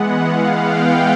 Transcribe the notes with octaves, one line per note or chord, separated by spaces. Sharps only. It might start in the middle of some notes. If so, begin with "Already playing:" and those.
Already playing: E3 G#3 B3 F#5
F5
G5